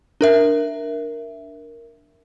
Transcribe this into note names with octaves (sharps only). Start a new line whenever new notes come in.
D4 A#4 E5